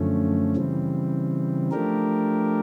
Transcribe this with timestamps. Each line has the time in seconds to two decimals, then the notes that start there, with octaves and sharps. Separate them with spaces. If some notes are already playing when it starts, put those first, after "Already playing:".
Already playing: F#2 D3 F3 A3 C#4
0.56 C#3 E3 G3 C4
1.71 F3 A3 D4 G4 A#4